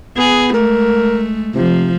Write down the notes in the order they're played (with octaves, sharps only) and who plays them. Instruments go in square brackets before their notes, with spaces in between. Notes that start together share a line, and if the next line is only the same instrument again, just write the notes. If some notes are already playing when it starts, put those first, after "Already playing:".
[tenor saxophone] B3 [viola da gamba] G#4
[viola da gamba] G#3 A3 [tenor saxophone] A#4
[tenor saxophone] C3 [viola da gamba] F3